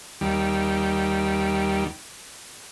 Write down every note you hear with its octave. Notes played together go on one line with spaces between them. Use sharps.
D#2 G3